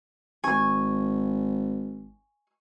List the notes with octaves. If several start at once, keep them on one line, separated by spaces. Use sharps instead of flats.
G#1 G#5 C#6